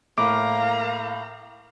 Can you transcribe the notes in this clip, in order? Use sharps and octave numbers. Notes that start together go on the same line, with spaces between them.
A2 A#3 F5 A#5 D6